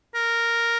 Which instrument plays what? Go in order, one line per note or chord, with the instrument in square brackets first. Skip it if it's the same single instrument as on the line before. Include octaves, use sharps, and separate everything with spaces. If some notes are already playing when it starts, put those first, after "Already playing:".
[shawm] A#4